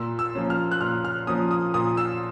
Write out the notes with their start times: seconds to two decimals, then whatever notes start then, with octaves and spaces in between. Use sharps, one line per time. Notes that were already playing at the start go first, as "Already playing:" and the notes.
Already playing: A#2 E6
0.19 E6
0.35 F3 A#3 C#4
0.50 F6
0.71 F#6
0.81 A#2 F6
1.05 F6
1.27 F3 A#3 C#4 D#6
1.51 D#6
1.74 A#2 D#6
1.97 E6